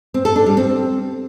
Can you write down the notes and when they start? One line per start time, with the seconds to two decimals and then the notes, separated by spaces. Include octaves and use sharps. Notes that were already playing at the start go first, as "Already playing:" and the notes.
0.14 C4
0.25 A4
0.36 D4
0.46 G3
0.57 C4